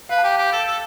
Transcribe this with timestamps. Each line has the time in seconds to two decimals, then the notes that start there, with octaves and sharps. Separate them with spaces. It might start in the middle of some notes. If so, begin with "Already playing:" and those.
0.09 B4 F5
0.18 A5
0.23 G4 G5
0.38 G4 A5
0.52 A4
0.67 A4